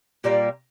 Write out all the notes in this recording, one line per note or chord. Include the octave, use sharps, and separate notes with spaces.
A#2 G3 A#3